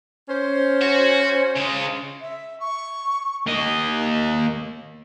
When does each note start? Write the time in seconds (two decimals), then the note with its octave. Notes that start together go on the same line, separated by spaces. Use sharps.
0.29 C#4 C5
0.81 F#4
1.56 C#3 G#3
2.21 E5
2.59 C#6
3.47 A#3 D#5